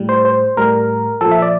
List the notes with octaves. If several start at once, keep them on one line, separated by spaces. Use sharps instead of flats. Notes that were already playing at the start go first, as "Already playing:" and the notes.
Already playing: A2 G3
C5
C5
A2 G3 A#4
A#2 F3 A4
E5
D5